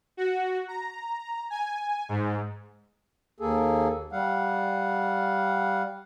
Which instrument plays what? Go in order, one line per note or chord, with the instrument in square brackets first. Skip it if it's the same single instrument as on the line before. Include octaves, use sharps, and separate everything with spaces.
[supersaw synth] F#4
A#5
G#5
G#2
[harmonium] D#2 A#3 G#4 A4
G3 F5 F#5